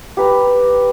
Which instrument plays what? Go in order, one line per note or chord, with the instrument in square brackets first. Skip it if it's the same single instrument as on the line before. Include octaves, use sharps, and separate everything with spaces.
[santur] G4 B4 A#5